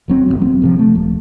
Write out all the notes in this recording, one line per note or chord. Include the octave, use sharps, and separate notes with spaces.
E1 F#3 C4
G1 G#2 B3
F#3 A#3 C4
F1 C3 F3
A3
D#1